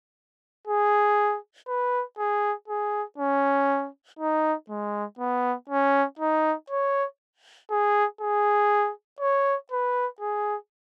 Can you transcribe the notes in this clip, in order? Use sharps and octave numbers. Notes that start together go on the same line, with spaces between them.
G#4
B4
G#4
G#4
C#4
D#4
G#3
B3
C#4
D#4
C#5
G#4
G#4
C#5
B4
G#4